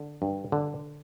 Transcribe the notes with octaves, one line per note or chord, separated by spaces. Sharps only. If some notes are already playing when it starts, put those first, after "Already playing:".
Already playing: D3
G2
D3